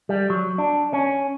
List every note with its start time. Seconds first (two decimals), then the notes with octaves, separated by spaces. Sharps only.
0.09 G3
0.30 F#3
0.58 D4
0.93 C#4